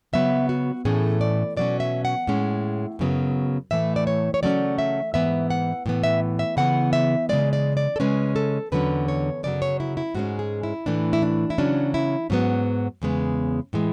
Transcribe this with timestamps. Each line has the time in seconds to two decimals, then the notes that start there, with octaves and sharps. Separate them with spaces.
0.13 C#3 F#3 B3 E5
0.49 F#4
0.85 A2 E3 A3 C#4 G#4
1.21 D5
1.57 B2 F#3 C#4 D5
1.80 E5
2.05 F#5
2.27 A2 G#3 C#4
2.99 F#2 C#3 F#3 B3
3.71 A2 E3 A3 E5
3.96 D5
4.07 C#5
4.34 C#5
4.43 C#3 F#3 A3 C#4 D5
4.78 E5
5.14 G#2 E3 B3 E5
5.50 F#5
5.86 A2 E3 B3
6.04 E5
6.39 E5
6.57 C#3 E3 B3 F#5
6.93 E5
7.29 C#3 E3 G#3 D5
7.53 D5
7.77 D5
7.96 A4
8.00 C#3 G#3 C#4 B4
8.36 A4
8.72 E2 D3 F#3 C#4 B4
9.08 C#5
9.43 F#2 C#3 F#3 D5
9.62 C#5
9.80 E4
9.97 E4
10.15 G#2 G#3 C#4 F#4
10.39 G#4
10.63 E4
10.86 A2 E3 A3 D4
11.13 E4
11.22 D4
11.50 E4
11.58 C#3 F#3 C#4 D4
11.94 E4
12.30 G#2 F#3 B3 C#4
13.02 E2 C#3 G#3 B3
13.73 A2 E3 G#3